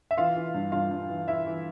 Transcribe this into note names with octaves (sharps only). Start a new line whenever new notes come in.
E5
E3 F4 F5
E3
G2
G2 F4 F5
G2
E3
E3 E4 E5
E3